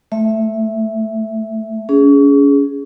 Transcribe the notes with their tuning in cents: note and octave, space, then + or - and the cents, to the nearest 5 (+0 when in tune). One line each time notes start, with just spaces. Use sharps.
A3 +0 E5 +0
C#4 +35 G#4 +5